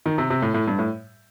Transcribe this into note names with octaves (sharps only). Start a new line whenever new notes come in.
D#3
C3
C3
A2
A2
G2
A2